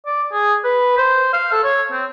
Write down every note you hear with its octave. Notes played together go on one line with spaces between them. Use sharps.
D5
G#4
B4
C5
F5
A4
C#5
C4